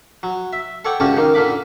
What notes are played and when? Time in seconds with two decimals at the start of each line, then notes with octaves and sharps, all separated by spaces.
0.23 F#3
0.53 E5
0.85 A4 C#5 D5 F#5 G5
1.00 C#2 C#3 C#4 F#4 G4 A5
1.17 D#3 A#3
1.34 A#2 D3 A#3 B5 D6